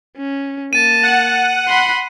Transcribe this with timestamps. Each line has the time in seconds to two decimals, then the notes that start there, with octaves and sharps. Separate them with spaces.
0.17 C#4
0.73 A#3 A5 D#7
1.03 F#5
1.68 B5 C6